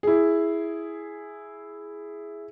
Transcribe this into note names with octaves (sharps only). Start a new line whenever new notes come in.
E4 G#4